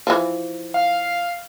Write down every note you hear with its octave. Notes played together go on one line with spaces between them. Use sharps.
E3 F3
F5